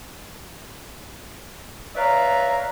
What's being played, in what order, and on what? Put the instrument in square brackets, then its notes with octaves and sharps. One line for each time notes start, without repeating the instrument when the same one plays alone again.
[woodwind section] B4 C#5 D5 E5 F5 A#5